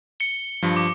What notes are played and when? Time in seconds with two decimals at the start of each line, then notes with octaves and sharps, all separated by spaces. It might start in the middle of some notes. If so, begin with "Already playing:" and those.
0.20 C#7 G7
0.63 G2 F3
0.77 D6